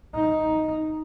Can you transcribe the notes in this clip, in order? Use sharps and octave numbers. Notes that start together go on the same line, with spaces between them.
D#4